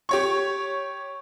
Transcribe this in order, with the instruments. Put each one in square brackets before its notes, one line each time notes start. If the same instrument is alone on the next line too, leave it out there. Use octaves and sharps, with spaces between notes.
[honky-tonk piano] G4 C#5 C#6